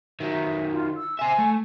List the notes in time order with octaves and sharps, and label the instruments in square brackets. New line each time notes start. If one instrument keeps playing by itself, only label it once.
[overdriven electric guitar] D#3 F#3 [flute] E5
[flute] F4
E6
[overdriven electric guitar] C5 E5 [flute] G#5
[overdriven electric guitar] A3